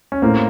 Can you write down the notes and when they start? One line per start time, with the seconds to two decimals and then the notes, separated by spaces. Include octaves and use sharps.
0.12 C#4
0.22 A2 A#3 C4